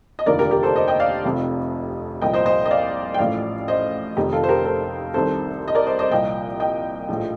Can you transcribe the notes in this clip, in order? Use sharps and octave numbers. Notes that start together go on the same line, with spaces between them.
D#5
F1 D#2 D3 F3 A#4 D5
G4 A#4
G4 A#4
A4 C5
C5 D#5
D#5 G5
D5 F5
F1 F2 C3 F3
C2 A#2 F3 D#5 G5
C5 D#5
C5 D#5
D#5
D5 F5
G5
A1 A2 F3 D5 F5
C5 D#5
F1 F2 D#3 D#4 G4
F4 A4
C5
G4 A#4
A4 C5
C2 C3 D#3 A4 C5
D#5
A#4 D5
C5 D#5
C5 D#5
C2 A#2 F3 D#5 G5
D#5 G5
A#1 A2 F3